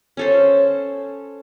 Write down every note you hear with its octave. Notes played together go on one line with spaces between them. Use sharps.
C#4 A4 C5